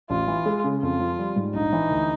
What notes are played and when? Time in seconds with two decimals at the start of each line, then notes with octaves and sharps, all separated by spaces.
0.10 A1 F4
0.28 E3
0.46 G#3
0.64 C#3
0.82 F2 F4
1.00 F3
1.19 G3
1.36 G#2
1.54 A#1 D#4
1.73 E3
1.90 D2